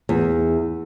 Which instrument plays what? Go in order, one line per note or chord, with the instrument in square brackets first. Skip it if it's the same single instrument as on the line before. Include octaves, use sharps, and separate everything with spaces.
[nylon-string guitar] E2